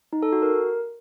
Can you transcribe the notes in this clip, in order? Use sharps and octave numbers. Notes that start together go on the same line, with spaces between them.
D#4
A4
F#4
A#4